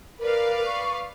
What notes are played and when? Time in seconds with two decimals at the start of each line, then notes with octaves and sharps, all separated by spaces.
0.19 A#4 B4 D5 F5
0.66 C#6